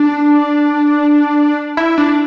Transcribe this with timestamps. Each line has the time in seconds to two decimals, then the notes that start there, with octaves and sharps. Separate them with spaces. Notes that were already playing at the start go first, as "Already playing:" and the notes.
Already playing: D4
1.77 E4
1.98 D4